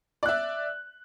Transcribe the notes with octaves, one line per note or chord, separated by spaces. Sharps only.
D5 E5 F#6